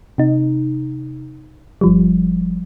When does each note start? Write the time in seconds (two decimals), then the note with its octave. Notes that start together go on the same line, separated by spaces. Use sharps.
0.18 C3 D#4
1.81 G1 F3 G3